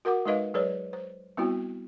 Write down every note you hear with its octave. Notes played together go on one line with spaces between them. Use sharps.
F#4 A#4 F#5 D6
G#3 D#4 B4 D#5 F5
F#3 G#4 B4 C#5 D5
C5
G3 B3 C4 E4 F#4